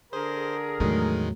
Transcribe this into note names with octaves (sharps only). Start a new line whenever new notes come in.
D3 G#4 A#4 C5
E2 A2 D#3 F#3 G#3 A3